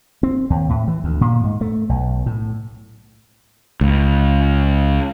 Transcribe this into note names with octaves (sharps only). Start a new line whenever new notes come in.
C4
D#2
A2
E3
D2
A#2
G#2
A3
B1
A2
C#2